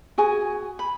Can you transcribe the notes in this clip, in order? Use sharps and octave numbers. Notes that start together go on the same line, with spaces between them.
F#4 G#4 G#5
B5